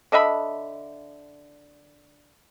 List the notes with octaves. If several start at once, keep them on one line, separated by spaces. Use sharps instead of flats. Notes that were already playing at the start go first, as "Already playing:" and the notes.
D3 D#5 E5 B5